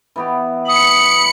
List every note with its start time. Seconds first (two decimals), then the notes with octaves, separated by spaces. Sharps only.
0.16 E3 B3 G4
0.68 B5 D#6 C#7